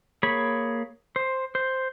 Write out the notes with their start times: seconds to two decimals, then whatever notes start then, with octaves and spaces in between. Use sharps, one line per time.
0.23 A#3 G#4 C#5 B5
1.16 C5
1.55 C5